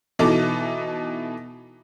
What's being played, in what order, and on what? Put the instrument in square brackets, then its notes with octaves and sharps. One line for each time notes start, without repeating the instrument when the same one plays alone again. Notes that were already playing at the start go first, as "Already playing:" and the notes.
[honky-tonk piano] B2 E3 D#4 A4 D6